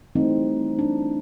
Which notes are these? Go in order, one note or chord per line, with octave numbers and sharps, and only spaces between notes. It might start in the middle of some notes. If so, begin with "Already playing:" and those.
E3 G3 A3 C4 D#4
D4